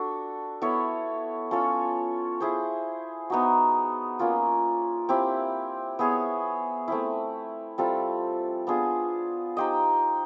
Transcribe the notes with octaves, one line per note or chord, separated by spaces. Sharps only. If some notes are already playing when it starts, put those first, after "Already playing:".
Already playing: D4 F#4 A4
B3 E4 A4 C#5
C#4 F4 A4 C#5
E4 G#4 C5
B3 D#4 F#4
A#3 C#4 F4
C4 E4 G4
B3 E4 G#4 C#5
A3 C4 E4
G3 C4 F4 A4
B3 D4 F4 G#4
D#4 G4 C5 D#5